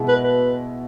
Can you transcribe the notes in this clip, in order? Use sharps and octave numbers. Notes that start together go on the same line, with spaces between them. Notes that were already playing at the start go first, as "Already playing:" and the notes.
Already playing: B2 G#3 B3 E4
B4
B4